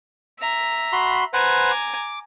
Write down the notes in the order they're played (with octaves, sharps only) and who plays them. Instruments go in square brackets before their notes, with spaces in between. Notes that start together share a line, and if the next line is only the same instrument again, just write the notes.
[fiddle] E5 A#5
[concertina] F#4 B5 C6
[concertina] B4 C5 F#5 [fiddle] G#5 A#5
[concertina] D6